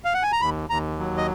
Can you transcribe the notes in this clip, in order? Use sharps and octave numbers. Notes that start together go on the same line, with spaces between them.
F5
F#5
G#5
A#5
D#2 B5
D#2 A#5
F#3
D#5